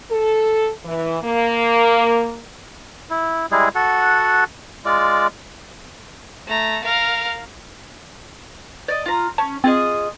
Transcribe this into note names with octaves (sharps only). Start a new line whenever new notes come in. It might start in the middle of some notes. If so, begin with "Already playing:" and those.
A4
E3
A#3
E4
G3 G#3 E4 G#4
F#4 A4 F#5
G#3 F4 D5
A3 A#5
A#4 F5
D5 D#5
F4 A#5
C#4 A5
C4 F4 G#4 D#5